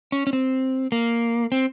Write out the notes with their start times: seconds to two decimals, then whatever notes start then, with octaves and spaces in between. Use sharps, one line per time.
0.12 C#4
0.27 C#4
0.33 C4
0.92 A#3
1.52 C4